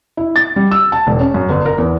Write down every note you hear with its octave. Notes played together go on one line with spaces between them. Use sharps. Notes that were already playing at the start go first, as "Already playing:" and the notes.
E4
A6
G3
E6
A5
E1
C#4
F#2
G1
A#4
E2